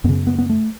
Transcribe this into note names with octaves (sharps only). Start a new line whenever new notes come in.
F#2 C#3 B3
B3
B3
A3